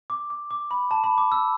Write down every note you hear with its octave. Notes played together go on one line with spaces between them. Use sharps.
D6
D6
D6
B5
A5
B5
D6
E6